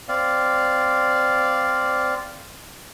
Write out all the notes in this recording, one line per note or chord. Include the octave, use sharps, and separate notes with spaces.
C4 D5 F5